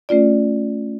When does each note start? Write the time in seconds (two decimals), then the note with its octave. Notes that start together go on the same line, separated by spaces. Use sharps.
0.09 A3 C#4 F4 D5